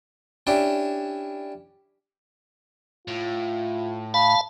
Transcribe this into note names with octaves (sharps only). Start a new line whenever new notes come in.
C#4 D4 E4 G4
A2 F4
F5 A5 B5